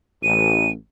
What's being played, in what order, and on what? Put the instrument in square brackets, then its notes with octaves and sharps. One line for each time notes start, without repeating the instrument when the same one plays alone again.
[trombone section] A1 [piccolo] D#7